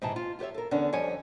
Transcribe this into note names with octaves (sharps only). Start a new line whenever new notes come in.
G#2 C3 E3 A5
F4
F4 G4 C5 C#5 E5
A4 A#4
E2 D3 B3 C#4 D4
F2 G3 C#5 G#5